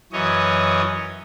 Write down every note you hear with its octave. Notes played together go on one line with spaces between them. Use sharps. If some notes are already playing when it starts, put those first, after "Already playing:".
F#2 E3 C#5 D#5